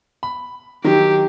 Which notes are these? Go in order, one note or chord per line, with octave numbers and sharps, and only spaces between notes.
B5
D#3 F#3 G4